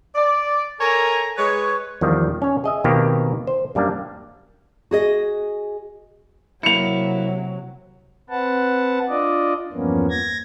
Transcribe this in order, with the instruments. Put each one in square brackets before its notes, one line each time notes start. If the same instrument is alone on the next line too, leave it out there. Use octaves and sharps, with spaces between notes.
[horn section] D5
A4 A#4 C#5 G#5 A#5
G#3 B4 C#5
[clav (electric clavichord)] E2 D#3 F3 G3
C#4 C#5
G#4 D#5 E5
B2 D#3 A#3 C4 G4
C5
F#2 G3 A#3 D4
[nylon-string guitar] F#4 G#4 D#5
[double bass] C3 F#3 [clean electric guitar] A#3 E4 [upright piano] C#7 F7
[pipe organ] C4 B4 F#5 A5
D4 F4 D5 D#5
E2 G2 F3 A#3 B3 C#4
G#6 A#6